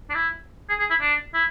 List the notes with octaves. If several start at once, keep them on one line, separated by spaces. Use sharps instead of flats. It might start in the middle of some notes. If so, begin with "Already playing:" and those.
D4
E4
G#4
G#4
E4
D4
E4